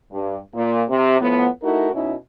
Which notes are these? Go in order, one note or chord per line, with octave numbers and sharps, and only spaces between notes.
G2
A#2
C3
A2 F3 B3
A3 D#4 E4 F#4 A#4
B2 C#4 D#4 E4